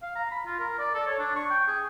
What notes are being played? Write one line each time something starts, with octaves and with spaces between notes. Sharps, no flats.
F5
A#5
B5
F4
A#4
D5
A4
C#5
D4
C#6
G5
G#4